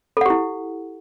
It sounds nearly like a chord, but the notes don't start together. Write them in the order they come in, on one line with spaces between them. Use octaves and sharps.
A4 F#5 G4 E4